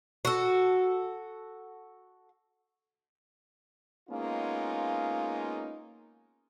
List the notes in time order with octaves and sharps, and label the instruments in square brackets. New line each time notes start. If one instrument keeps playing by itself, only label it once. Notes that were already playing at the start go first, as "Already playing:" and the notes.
[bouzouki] F#4 A4
[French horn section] G#3 A#3 B3 C#4 D#4 F4